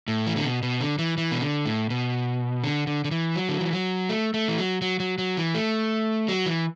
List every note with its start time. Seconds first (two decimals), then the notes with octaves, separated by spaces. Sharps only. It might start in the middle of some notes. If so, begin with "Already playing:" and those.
0.08 A2
0.27 E3
0.36 D3
0.44 B2
0.63 B2
0.81 D3
0.99 E3
1.18 E3
1.32 B2
1.41 D3
1.66 A2
1.90 B2
2.64 D3
2.87 D3
3.04 D3
3.11 E3
3.36 F#3
3.49 D3
3.61 E3
3.73 F#3
4.09 A3
4.34 A3
4.48 E3
4.58 F#3
4.82 F#3
5.00 F#3
5.18 F#3
5.37 E3
5.55 A3
6.28 F#3
6.46 E3